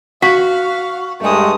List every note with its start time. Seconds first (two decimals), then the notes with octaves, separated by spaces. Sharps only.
0.22 F#4 F5 B6
1.21 G2 G#3 A3 D#6